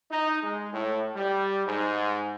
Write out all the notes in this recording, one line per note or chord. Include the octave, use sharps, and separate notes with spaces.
D#4
G#3
A2
G3
G#2